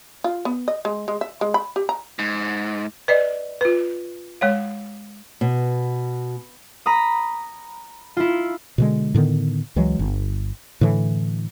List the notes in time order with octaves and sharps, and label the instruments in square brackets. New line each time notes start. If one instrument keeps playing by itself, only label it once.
[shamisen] F4
B3
D#5
G#3
G#3
E5
G#3
B5
G4
A#5
[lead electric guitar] G#2
[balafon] B4 D5 D#5
F4 B4
G#3 C#5 F5
[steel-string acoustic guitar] B2
[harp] A#5 B5 D#6
E4 F4
[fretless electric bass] B2 D3 G#3
A2 D3 D#3 B3
C#2 E3 F#3 G#3
G1
A2 D3 E3